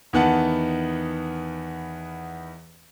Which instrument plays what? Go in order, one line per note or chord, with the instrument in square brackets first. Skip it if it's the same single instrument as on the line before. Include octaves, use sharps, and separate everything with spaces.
[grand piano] E2 D#3 B3 F#5 A5